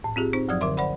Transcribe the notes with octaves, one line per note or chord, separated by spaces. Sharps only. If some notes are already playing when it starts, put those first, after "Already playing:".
A2
C4 F4 G4 G#4
C4 D#4 C5
F#2 F3 F#3 D5 D#6 G#6
D3 A#4 E5 C6
C5 D5 F#5 B5